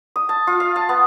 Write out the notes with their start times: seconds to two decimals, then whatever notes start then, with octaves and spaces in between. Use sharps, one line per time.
0.16 D#6
0.29 A5
0.47 F4
0.60 F5
0.76 A5
0.89 B3